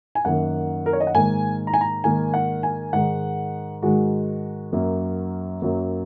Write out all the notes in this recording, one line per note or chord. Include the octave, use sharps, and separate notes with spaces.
G#5
F#2 D#3 A#3 F#5
A#4
C#5
D#5
F#5
G#2 D#3 A#3 G#5
A#5
G#5
A#5
G#2 D#3 A#3 G#5
F#5
G#5
G#2 D#3 G#3 F#5
G#2 D#3 G#3 F#4
F#2 F#3 A#3
F#2 F#3 A#3